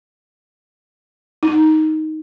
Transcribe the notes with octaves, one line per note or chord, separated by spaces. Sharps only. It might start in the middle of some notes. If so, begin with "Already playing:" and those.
D#4